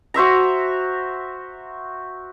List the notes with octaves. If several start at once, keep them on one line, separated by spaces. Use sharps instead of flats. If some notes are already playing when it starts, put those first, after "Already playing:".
F#4 C5 E5 A#5